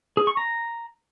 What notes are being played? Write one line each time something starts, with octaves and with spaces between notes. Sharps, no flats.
G#4
C#6
A#5